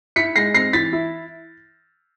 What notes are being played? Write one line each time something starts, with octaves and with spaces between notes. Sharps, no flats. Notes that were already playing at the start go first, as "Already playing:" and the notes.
E4 B6 C#7
G#3 A#6 C7
C4 A#6 C7
E3 A6 B6
E4